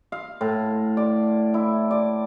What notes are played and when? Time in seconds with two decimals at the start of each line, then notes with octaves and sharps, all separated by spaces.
0.12 F5
0.41 A2
0.97 D5
1.54 E4
1.91 D5